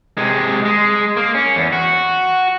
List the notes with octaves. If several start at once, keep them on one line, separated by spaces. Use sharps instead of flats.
C3 G#3
G#3
A#3
C#4
E2
F#4